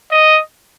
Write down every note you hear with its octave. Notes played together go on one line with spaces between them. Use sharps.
D#5